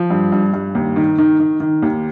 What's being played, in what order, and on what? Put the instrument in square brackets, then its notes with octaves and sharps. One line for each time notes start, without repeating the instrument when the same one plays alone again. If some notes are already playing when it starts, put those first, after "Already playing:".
Already playing: [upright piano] F3
G2
G2
G2
D#2
D#3
D#3
D#3
D#3
D#2